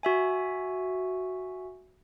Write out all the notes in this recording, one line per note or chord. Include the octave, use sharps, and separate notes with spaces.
F#4 E5 G#5